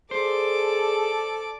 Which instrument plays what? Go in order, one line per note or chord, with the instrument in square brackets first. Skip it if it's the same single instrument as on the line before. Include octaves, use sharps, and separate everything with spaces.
[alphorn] G#4 [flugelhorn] A4 [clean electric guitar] C5 [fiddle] D5 D6